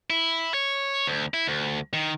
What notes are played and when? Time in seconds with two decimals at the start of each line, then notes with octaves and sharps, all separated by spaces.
0.10 E4
0.54 C#5
1.07 D2
1.34 E4
1.47 D2
1.93 D#3